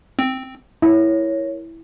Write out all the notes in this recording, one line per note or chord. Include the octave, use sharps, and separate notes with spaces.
C4
E4 A#4 C#5